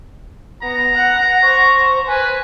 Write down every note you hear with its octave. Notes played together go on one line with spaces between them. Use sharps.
B3 A#5
F#5 F#6
C5 C#6
B4 G#5